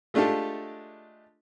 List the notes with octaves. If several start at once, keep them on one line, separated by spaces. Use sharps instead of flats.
G#3 A3 D4 F4 G4 A4